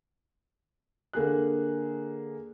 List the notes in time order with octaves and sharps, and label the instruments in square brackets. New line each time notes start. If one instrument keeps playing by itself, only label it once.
[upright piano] D3 A#3 G#4 F#6